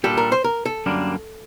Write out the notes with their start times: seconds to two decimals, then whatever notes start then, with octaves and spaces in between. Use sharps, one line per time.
0.04 A#2 G3 D4 G4 A4
0.17 A#4
0.32 C5
0.44 A#4
0.65 A4
0.86 F#2 D3 G3 A#3 D4